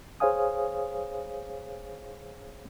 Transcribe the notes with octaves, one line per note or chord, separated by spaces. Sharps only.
G#4 C5 C#5 F5 G#5 D#6